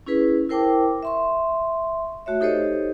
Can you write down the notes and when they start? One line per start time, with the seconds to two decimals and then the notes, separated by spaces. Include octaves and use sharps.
0.06 C#4 E4 G#4 B4
0.49 E4 A#4 C5 G5 A5 D6
1.03 E5 C6 C#6
2.26 A3 F#4 C#5 E5
2.41 D#4 G4 A4 C5 C#5 D#5